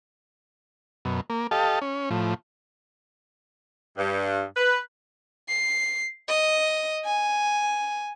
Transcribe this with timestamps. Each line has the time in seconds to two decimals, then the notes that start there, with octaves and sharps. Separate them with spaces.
1.05 F#2 B2
1.30 A#3
1.51 G4 A4 D#5 F5 A5
1.82 C#4
2.11 A2 F3
3.98 G2
4.56 B4
5.49 C7
6.29 D#5
7.05 G#5